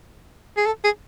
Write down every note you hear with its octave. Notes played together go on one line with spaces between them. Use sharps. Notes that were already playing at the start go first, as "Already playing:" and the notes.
G#4
A4
G#4